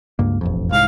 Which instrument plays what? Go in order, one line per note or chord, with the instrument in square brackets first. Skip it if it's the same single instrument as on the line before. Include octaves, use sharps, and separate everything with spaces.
[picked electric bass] C#2 G2 A#3
E1 A1 F2
[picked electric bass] C2 G#2 [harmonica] F5